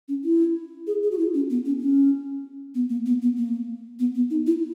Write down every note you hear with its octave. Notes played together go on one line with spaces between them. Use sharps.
C#4
E4
G#4
G#4
F#4
E4
C#4
B3
C#4
C#4
B3
A#3
B3
B3
A#3
B3
B3
D#4
E4